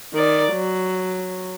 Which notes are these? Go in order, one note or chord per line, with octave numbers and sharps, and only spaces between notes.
D#3 D5
F#3